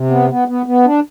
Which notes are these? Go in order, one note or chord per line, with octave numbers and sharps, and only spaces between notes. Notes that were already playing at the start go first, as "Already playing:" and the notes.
Already playing: C3
B3
B3
B3
B3
D4